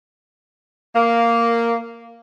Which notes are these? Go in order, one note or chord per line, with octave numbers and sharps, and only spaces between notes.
A#3